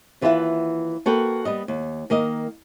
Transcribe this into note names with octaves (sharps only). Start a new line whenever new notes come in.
D#2 E3 F4 B4 E5 F#5
A#3 F#4 A4 B4 G5
G3 B3 D#5
D#2
D#3 A#3 D#5